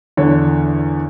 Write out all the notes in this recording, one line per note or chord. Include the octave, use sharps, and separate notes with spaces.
E2 D3 C#5